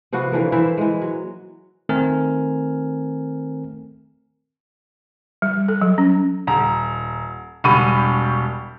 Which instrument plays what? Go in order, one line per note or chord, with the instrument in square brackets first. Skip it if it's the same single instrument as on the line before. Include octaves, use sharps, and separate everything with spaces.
[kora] C3 F3 B3 F#4
D3 E3 F3 A#3
E3 E4 C5 E5
E3 G#3
F#3
[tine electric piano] D#3 A3 C4 A#4 G#5 F6
[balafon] G3
A4
F#3
C#4
[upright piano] D#1 A#5
E1 G3 B5 C#6 D#7